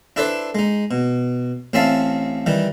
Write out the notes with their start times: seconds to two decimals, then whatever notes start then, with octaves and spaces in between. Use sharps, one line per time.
0.16 D4 E4 A4 B4 C5 D5
0.55 G#3 D#4
0.91 B2
1.73 A1 C4 C#4 E5 F5 A5
2.46 D#3 E3 G3